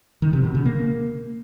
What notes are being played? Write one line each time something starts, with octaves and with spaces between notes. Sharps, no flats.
D#3
C3
B2
C#3
A#3